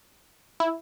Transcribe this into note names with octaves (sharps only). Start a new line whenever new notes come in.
E4